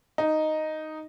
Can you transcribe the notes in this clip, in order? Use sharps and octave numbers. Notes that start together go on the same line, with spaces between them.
D#4